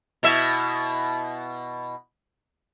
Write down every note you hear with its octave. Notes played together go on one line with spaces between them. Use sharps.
B2 E4 E5